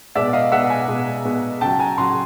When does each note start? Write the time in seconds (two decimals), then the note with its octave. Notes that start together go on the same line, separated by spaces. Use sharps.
0.15 B2 G#3 D5 E5
0.33 D#5 F5
0.52 B2 G#3 E5 F#5
0.70 F#5 G#5
0.88 B2 G#3
1.25 B2 G#3
1.61 C#3 F#3 G5 A5
1.79 G#5 A#5
1.98 C#3 F#3 A#5 C6